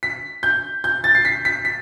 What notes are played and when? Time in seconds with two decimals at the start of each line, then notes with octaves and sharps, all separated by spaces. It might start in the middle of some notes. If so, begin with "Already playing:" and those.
0.03 B6
0.43 G6
0.84 G6
1.04 A6
1.15 C7
1.25 B6
1.45 B6
1.65 B6